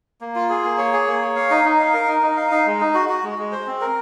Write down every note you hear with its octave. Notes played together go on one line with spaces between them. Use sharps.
A#3
F4
G#4
A#3
C#5
G#4
A#3
C#5
F5
D#4
D#4
F5
A#4
D#4
D#4
F5
D#4
G#3
D#4
F#4
F#4
G#3
G#3
C5
C4
A#4